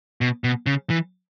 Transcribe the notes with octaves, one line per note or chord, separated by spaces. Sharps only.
B2
B2
C#3
E3